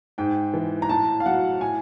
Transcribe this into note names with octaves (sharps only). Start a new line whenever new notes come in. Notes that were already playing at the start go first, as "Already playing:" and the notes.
G#2 G5
E3
A#5
A2 A5
F5
F#3 F#5
A2 G#5